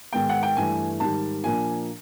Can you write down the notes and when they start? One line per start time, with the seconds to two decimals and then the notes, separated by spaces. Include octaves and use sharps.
0.13 G#2 D#3 G#3 B3 G5
0.29 F#5
0.43 G5
0.57 G2 E3 A3 G#5
1.00 G#2 D#3 G3 A5
1.44 A#2 F3 A#3 D4 G#5